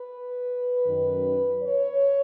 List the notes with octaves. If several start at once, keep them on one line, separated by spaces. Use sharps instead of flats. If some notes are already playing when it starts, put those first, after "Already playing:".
Already playing: B4
F#2 D#3
C#5